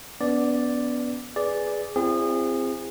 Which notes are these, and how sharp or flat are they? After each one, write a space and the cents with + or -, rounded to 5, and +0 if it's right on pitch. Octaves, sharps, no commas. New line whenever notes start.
B3 +0 D4 -40 D5 +0
G#4 +0 B4 +0 D5 -5
C4 +0 E4 +45 G#4 -30